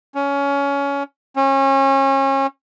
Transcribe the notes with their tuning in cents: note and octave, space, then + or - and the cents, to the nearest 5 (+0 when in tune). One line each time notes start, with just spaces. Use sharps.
C#4 +20
C#4 -30